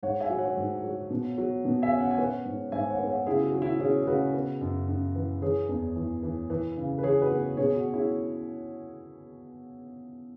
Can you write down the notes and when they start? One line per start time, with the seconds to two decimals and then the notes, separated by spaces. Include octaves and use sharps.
0.03 G#2 C#5 F#5
0.20 E5 G#5
0.29 F#3
0.38 C#5 F#5
0.57 G#2
0.84 F#3
1.10 B2
1.38 F#3
1.65 B2
1.82 E5 G#5
1.92 C#4
2.00 F#5
2.11 G#5
2.18 B3 C#5 F#5
2.45 G#2
2.72 G#2 E5 G#5
2.90 C#5 F#5
2.99 B3
3.08 C#5 F#5
3.26 C#3 E4 G#4
3.44 F#4
3.53 F#3
3.62 E4
3.80 C#4 E4 G#4
4.02 G#4
4.07 C#3 F#4 B4
4.34 B3
4.61 F#2
4.88 F#2
5.15 E3
5.42 E3 G#4 C#5
5.69 E2
5.96 E3
6.23 E3
6.50 E3
6.77 C#3
6.98 B4
7.03 E3 G#4 C#5
7.22 F#4 B4
7.31 B3
7.57 B2 G#4 C#5
7.76 F#4
7.85 C#4
7.94 E4 G#4